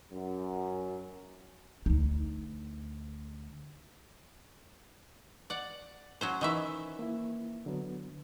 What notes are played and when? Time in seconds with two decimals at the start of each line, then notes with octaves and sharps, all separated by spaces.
0.13 F#2
1.86 D2 D#4
5.50 D5 F#5
6.21 F#3 C#4 C5
6.41 D#3 E3 E5
6.99 A#3 E4
7.66 D3 F#3 B3